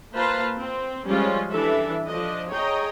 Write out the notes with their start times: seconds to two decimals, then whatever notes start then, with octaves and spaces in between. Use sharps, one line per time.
0.13 A#3 F4 B4 C5 F5 A5
0.60 C4
1.08 F3 G3 G#3 C#4 F4
1.50 E3 D4 A4 E5
2.07 F3 D4 D#5
2.50 G#4 C#5 D#5 G5 A#5